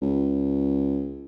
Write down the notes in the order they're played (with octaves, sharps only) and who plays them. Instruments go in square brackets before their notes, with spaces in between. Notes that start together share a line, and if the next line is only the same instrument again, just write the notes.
[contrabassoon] C#2